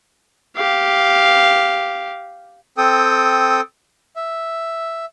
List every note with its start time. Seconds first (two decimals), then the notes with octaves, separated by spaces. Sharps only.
0.56 G4 F5
2.78 C4 A4 G5 D#6
4.16 E5